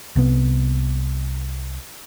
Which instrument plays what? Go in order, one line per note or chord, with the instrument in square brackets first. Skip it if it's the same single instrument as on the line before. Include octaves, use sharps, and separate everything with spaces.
[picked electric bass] C2 C3 B3